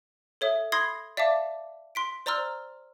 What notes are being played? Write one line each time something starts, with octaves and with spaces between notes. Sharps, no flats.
A4 C#5 E5 D#6
B5 C6 D#6 G#6 A#6 C7
D5 E5 F5 A5 D6
C6 B6 D7
C5 D5 A#5 C6 E6 F6